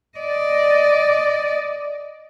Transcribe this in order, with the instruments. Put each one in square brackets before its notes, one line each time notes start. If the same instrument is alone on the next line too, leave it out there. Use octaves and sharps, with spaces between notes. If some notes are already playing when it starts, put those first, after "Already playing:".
[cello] D5 D#5